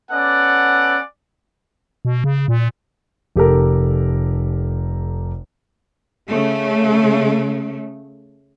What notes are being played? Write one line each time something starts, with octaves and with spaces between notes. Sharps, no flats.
B3 C#4 A4 D5 F#5
B2
C#3
A#2
F1 G4 A4 A#4
C#3 A3